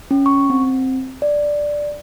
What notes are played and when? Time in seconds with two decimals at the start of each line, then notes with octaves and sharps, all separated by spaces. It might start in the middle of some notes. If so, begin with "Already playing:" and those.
0.11 C#4
0.26 C#6
0.50 C4
1.22 D5